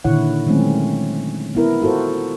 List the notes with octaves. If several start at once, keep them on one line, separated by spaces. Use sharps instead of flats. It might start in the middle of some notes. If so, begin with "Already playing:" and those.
A#2 D3 D#3 E4 C#5 F#5
D#3 F#3 G#3 A3 C4 C#4
B3 E4 A#4
F4 F#4 A4 A#4 C5